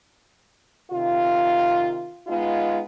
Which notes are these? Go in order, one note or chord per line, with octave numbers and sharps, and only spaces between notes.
C3 D#3 F4
G#3 B3 D#4 F4